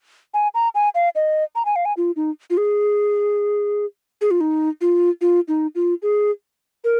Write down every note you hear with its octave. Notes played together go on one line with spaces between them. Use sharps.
G#5
A#5
G#5
F5
D#5
A#5
G#5
F5
G#5
F4
D#4
F4
G#4
G#4
F4
D#4
F4
F4
D#4
F4
G#4
A#4